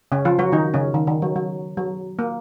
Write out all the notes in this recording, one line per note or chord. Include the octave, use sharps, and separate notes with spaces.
C#3 C#4
F3 F4
F#3 F#4
D#3 D#4
C#3 C#4
D#3
D#3
F#3
F#3
F#3
A#3